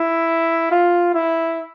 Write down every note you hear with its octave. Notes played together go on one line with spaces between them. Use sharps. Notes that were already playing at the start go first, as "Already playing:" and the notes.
Already playing: E4
F4
E4